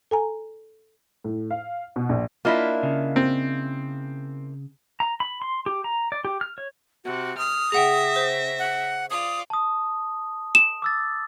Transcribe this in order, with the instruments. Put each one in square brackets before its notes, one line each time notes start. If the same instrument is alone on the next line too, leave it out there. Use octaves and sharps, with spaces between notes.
[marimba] A4 G#5 A#5
[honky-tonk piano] A2
F5
B2
A#1
[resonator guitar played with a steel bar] A#3 D4 E4 [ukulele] F4 D#5 E5
[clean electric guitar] C#3
[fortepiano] C4
[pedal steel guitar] A#5
B5
C6
G4
A#5
D5
G4
F6
C#5
[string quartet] C3 [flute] F#4
[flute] D#6 [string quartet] F6
[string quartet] C#3 E5 A#6 [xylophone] G#4 F#5 G5
[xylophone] C5
[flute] F#5
[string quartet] F4 D5 [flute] D#6
[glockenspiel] A5 D#6
[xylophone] E7
[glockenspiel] D6 E6 A6